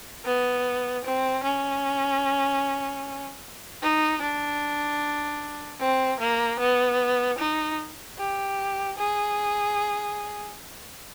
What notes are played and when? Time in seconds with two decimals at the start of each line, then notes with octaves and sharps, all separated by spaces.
0.25 B3
1.04 C4
1.44 C#4
3.82 D#4
4.21 D4
5.80 C4
6.20 A#3
6.60 B3
7.38 D#4
8.18 G4
8.97 G#4